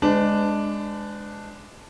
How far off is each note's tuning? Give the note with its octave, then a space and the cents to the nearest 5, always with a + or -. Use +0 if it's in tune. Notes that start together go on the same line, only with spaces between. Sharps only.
G#3 +0 D4 +0 B4 +45